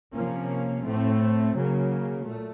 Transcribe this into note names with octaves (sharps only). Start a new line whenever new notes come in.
C3 F3 A#3 C#4
A2 A3 C4
C#3 F#3 A#3
A#2 A3